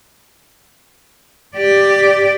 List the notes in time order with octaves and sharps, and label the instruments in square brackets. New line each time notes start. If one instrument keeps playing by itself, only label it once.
[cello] G4 D5